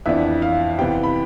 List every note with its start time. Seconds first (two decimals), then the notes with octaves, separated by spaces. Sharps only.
0.06 F2 E3 B3 D4 E5
0.42 F5
0.78 C3 E3 B3 G5
1.03 B5